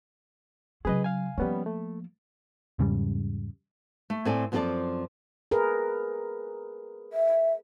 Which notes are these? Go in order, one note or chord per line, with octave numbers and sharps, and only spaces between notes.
C#3 F#3 G#4 B4 D#5
F5 G#5
F3 G3 A#3 B3 C#4
A3
E2 G#2 C#3 G3
A3
A2 C4 A4 D5 G#5
F#2 F3 C4 G4 A4 D5
G#4 A#4 B4
E5